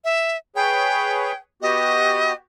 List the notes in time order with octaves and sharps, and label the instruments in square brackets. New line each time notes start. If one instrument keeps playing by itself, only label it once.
[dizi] E5
[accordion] G#4 B4 C#5 [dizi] G5
[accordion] B3 F#4 G4 [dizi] D#5